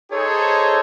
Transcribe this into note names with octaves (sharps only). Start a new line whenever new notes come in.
D#4 G#4 A4 C5 C#5